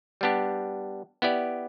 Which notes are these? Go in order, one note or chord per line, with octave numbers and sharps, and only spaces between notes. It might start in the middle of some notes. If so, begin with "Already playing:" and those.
G3 B3 D4 G4
B3 E4 G4 D5